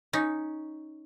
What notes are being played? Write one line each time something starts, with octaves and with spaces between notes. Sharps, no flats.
C#4 D#4